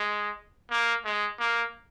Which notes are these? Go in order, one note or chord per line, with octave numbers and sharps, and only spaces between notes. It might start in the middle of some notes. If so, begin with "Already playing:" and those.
Already playing: G#3
A#3
G#3
A#3